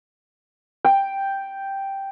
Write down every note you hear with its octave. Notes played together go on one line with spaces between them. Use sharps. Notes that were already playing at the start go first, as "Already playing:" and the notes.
G5